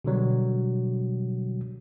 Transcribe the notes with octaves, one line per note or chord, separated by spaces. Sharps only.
B2 D3 F#3 G3